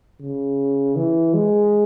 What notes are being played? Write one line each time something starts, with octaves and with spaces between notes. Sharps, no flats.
C#3
E3
G#3